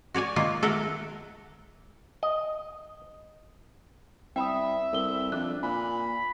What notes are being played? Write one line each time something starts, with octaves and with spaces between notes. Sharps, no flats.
F#4 C#5 D5 G#5
D#3 A#3 F4
A4 A#4 E5 F#5
D#5
C2 E5 G5 B5 D#6
C2 A4 A#4 G7
F2 D4 D6 F#6
A#2 G#5 B5